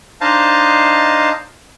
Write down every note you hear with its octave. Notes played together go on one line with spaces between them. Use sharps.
D4 D#4 C5 D#5 F5 A5